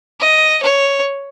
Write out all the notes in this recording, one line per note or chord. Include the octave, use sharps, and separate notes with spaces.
D#5
C#5